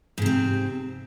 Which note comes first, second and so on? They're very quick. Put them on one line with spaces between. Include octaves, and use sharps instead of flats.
G#2 C3 C4